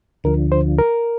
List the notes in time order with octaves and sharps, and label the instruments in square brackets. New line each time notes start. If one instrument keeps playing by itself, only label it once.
[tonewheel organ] D2 D3 F3 [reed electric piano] A#4
[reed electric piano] C5
A#4